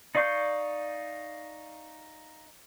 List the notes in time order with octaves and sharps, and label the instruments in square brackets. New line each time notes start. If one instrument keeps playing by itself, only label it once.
[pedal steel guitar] D#4 D5 F5 C#6 G6